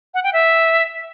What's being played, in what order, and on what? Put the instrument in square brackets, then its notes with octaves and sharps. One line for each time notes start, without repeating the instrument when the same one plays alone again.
[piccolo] F#5
G5
E5